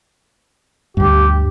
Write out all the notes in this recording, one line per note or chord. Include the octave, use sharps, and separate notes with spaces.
D2 G2 G4